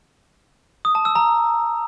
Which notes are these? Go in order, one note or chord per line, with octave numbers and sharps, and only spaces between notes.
D#6
A5
E6
A#5